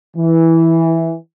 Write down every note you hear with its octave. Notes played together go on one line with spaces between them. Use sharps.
E3